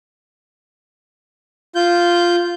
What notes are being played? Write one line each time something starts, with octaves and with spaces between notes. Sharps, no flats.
F4 G6